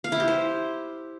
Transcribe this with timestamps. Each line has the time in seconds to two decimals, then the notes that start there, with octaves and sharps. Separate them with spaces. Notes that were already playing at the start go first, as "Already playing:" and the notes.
0.04 F5
0.12 E4
0.20 G4
0.28 C5